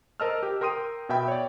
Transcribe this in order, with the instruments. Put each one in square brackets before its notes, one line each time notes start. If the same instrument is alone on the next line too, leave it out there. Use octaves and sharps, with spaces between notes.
[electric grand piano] A#4 C5 D#5 A5 E6 F6
G4
A#4 G5 C6 D#6 D#7
B2 E5 G5 B5
C#5 D5